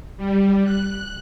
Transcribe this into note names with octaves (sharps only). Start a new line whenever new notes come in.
G3
F#6